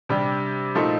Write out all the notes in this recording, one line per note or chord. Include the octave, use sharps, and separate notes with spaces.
C3 G3 D4 G4
A#2 F3 A3 D#4 A4